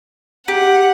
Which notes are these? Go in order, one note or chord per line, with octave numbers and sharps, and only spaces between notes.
G4 F#5